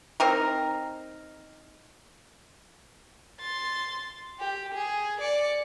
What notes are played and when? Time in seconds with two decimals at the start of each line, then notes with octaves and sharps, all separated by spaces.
0.20 C4 D#4 A#4
3.41 C6 A6
4.39 G4
4.74 G#4
5.20 D5 C#7